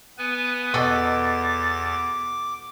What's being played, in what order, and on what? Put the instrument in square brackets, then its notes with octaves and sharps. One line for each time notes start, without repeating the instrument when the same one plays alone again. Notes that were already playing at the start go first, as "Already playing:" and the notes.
[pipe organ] B3 B4 G#5
[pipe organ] E2 A6 [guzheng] B2 A4 D#5 [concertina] D6